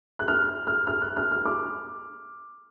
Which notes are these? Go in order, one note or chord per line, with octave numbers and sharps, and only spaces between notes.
F#6
F6
F6
F6
F#6
F6
F6
D6